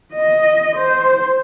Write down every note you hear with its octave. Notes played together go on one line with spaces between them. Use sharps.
D#5
C5